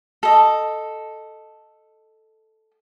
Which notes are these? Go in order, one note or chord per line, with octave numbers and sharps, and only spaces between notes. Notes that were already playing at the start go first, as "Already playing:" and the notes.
A4 D#5